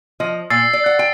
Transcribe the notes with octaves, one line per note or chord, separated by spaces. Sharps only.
F3 D#5
A#2 E6 A6 C7
D5
F#5
G5